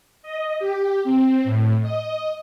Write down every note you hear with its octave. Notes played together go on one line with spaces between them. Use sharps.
D#5
G4
C4
A2
D#5